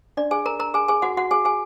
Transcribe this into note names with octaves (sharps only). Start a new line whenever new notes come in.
D4 D5
G#4 G#5
A#4 A#5
A#4 A#5
G#4 G#5
G#4 G#5
F#4 F#5
F#4 F#5
G#4 G#5
G#4 G#5